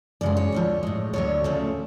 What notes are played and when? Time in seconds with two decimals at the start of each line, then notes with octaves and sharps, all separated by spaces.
0.21 F#2 C#3 G#3 D5
0.37 C#5
0.52 D2 D3 F3
0.83 A2 G#3
1.13 D2 D3 F#3 C#5
1.44 D2 C#3 F3 A3